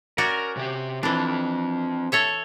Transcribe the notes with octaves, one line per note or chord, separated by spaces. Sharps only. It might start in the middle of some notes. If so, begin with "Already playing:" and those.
C#4 F#4 A#4 D5
C3 G4
E3 C4 D4 F4
A4 C#5 E5